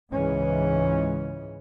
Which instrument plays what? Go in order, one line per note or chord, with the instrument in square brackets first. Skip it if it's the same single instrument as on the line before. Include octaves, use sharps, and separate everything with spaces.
[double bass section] C#2 G#2 C#3 E3 G#3 C#4